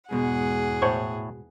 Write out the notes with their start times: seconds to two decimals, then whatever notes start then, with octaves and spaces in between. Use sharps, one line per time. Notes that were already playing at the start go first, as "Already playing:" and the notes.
0.11 E2 G#2 B2 G#3 G#4 F#5
0.82 A2 C5 C#5 C#6